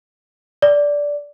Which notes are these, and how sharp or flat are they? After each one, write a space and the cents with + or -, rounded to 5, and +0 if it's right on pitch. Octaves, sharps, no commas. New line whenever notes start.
D5 -10